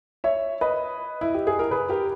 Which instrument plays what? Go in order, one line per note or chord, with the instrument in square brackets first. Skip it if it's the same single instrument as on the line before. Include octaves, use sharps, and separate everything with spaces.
[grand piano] C#5 E5
B4 D#5
E4
G4
G#4
A#4
G#4 B4
G4 A#4